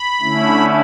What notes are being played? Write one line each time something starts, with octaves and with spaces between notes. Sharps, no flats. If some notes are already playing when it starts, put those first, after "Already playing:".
Already playing: B5
D3 A3 C#4 E4